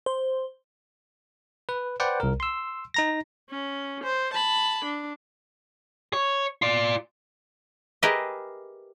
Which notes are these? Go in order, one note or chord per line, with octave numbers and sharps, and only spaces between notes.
C5
B4
B4 C5 D5 F#5 G5
C2 A#4
C6 E6
D#4 A#5 A#6
C#4
C5
A5 B5
D4
C#5
F4 D5
G4 G#4 A#4 B4 D#5 E5